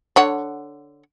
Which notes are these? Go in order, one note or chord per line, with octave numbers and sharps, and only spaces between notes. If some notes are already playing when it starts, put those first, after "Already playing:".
D3 C#5 F#5